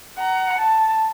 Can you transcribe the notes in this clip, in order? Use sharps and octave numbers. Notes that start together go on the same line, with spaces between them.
F#5 A#5
A5